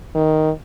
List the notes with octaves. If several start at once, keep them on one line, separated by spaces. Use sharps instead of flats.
D#3